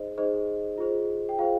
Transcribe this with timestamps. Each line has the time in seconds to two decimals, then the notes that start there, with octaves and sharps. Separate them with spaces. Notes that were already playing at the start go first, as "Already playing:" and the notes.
Already playing: D#4 G#4 C5 D#5
0.18 D#4 G#4 C5 D#5
0.78 F4 G#4 C5
1.29 G5
1.39 F4 G#4 C5 F5